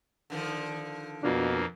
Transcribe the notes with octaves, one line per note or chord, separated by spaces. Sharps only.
D3 D#3 F3
F2 B2 A#3 D4 F4 B4